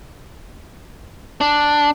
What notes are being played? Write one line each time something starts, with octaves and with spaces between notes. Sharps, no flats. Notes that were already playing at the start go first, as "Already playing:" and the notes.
D4